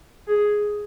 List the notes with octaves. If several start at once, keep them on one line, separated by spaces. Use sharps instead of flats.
G#4